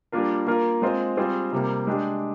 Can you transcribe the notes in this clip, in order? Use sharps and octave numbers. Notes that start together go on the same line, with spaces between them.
G3 A#3 D4 F4 A#4
A#3 F4 A#4
G#3 C4 F4 C5
G3 C4 F4 G#4 C5
C3 G3 A#3
G#3 D4 G4